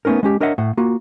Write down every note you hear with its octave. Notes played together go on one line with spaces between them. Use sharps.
A3 B3 C#4 D#4 A#4
G#3 C#4 G4
D4 A#4 C#5 D#5 E5 F#5
A2 F#5
A#3 F4 F#4